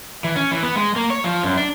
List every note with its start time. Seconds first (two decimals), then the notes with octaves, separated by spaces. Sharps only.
0.24 E3
0.36 C#4
0.51 E3
0.63 B3
0.76 G#3
0.96 A#3
1.10 C#5
1.24 F3
1.43 F#2
1.57 D4